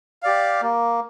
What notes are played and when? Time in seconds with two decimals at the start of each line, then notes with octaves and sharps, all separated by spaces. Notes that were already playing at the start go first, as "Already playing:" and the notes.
0.23 G4 D5 F5
0.62 A#3